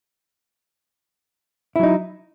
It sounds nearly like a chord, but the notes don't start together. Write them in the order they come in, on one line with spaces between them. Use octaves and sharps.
E4 F#3 D#4